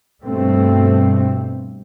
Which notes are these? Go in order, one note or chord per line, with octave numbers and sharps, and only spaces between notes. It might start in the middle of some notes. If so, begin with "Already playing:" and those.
G2 B2 A3 C4